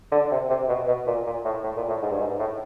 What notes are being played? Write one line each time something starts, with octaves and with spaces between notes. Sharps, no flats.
D3
C3
C3
B2
B2
A#2
A#2
A2
A2
A#2
A2
G#2
G2
G#2
A2